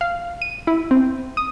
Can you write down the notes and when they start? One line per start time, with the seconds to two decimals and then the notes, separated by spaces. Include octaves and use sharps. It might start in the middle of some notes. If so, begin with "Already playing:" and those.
0.01 F5
0.42 D#7
0.67 E4
0.91 C4
1.37 D#6